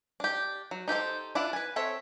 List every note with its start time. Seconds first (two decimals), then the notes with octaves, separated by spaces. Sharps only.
0.20 D4 G4
0.71 F#3
0.88 D#4 G4 A4 C5
1.35 D4 E4 F4 F#5
1.53 B4 G#5
1.76 C4 A4 C#5 E5